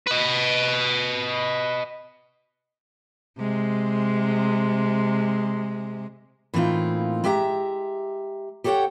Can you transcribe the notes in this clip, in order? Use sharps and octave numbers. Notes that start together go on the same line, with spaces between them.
B4 D#5
C3 G#3
A2 E3 A#3 C4 D#4 F4
G#3 G4 E5 F5 A#5
G4 A4 C#5 D5 F#5 G5